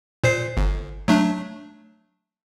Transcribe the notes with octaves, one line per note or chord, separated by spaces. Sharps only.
A#2 C5 C7
G1
F#3 A3 D4